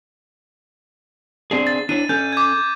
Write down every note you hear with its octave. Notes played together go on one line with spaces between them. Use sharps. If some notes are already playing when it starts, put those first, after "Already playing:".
C4 D4 G#4
A6
D4 E4 C#5 D#7
C#4 A4 G6
D6 G#6